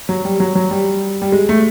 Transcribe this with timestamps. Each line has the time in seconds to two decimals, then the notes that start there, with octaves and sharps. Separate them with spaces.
0.09 F#3
0.25 G3
0.40 F#3
0.55 F#3
0.71 G3
1.22 G3
1.32 G#3
1.49 A3